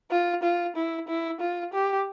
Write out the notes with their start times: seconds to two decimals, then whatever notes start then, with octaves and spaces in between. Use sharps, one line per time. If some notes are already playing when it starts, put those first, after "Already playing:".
0.11 F4
0.43 F4
0.76 E4
1.08 E4
1.41 F4
1.73 G4